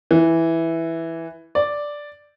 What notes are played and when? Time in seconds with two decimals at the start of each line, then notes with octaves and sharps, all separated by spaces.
0.11 E3
1.55 D5